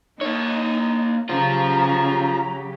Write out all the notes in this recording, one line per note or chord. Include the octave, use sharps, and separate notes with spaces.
A#3 D#4 C#5
C#3 F#3 F4 G4 C5 A#5